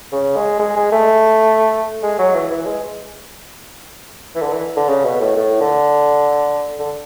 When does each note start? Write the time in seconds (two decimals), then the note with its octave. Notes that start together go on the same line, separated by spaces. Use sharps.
0.12 C#3
0.36 G#3
0.59 G#3
0.76 G#3
0.92 A3
2.03 G#3
2.19 F#3
2.35 E3
2.51 E3
2.66 G#3
4.35 E3
4.41 D3
4.53 E3
4.77 D3
4.89 C#3
5.05 B2
5.21 A2
5.37 A2
5.60 D3
6.79 D3